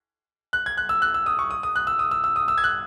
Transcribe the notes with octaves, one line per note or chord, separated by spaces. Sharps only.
F#6
G#6
F#6
E6
F#6
E6
D#6
C#6
D#6
D#6
F#6
E6
D#6
E6
E6
D#6
E6
G#6
F#6